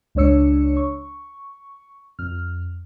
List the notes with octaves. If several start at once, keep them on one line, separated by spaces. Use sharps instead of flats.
C#2 G#3 D4 C#5 E6 C#7
C#6
F2 F6